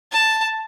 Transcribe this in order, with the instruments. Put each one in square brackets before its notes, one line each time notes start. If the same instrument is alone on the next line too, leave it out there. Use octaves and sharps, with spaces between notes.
[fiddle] A5